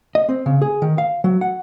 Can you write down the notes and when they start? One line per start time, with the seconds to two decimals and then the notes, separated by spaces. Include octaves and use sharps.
0.15 D#5
0.29 C4
0.46 C#3
0.62 G#4
0.82 D#3
0.98 F5
1.24 F#3
1.41 F#5